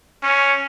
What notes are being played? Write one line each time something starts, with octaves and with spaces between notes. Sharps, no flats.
C#4